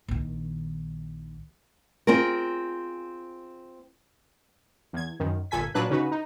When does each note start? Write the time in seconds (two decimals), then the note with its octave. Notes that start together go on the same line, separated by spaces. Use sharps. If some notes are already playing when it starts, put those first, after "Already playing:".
0.08 A#1 D#3
2.07 C4 F4 G#4 A#4
4.93 E2 G#6
5.20 F#2 D#3
5.51 G1 A#2 A4 G#5 G#6 B6
5.75 A#2 F#3 D4 B4 F#6
5.90 C#3 D#4 F#4 B4
6.12 D#4